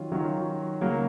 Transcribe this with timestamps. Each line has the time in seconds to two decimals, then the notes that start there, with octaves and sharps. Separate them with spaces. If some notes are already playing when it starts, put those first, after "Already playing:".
Already playing: D#3 F#3 C#4 F4
0.12 D#3 F#3 C#4 F4
0.81 C#3 F#3 A#3